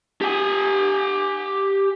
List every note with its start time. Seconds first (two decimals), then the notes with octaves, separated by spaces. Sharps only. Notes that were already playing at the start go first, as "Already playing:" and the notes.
0.21 G4 G#5